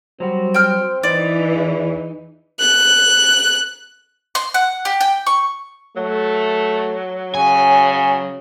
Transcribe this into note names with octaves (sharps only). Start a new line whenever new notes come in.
F#3 G3 C4 F#4
G5 F6
E3 D#4 D5
E2
F#6
C6
F#5
G4
G5
C#6
F#3 A3
C#3 G#5